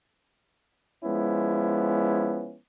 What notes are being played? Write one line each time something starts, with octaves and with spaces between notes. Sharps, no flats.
F3 G#3 B3 C#4 E4